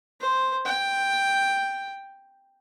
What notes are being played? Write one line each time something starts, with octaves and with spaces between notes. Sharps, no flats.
C5
G5